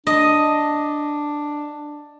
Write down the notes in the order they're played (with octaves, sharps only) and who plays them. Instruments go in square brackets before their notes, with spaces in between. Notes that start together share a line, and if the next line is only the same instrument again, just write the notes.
[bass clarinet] D4 [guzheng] D#5